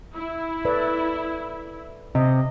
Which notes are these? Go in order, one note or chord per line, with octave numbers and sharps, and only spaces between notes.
E4
A4 B4 D5
C3 D#5